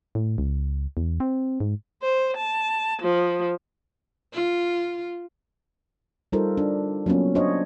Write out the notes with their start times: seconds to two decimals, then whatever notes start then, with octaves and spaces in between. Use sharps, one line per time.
0.15 A2
0.38 C#2
0.97 E2
1.20 C4
1.60 G#2
2.02 C5
2.36 A5
3.02 F3
4.33 F4
6.32 G3 D#4 F4 A4 A#4 C5
6.57 D4
7.06 F#3 A#3 B3 C#4 F4
7.35 D4 F#4 C5 C#5 D#5